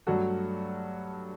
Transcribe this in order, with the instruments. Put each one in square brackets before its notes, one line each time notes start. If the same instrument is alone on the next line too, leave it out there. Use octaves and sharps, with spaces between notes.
[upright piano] G2 F#3 A3 F#4 A4